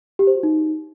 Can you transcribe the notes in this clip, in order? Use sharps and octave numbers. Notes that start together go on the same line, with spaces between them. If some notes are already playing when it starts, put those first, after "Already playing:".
G4
C5
F#4
D#4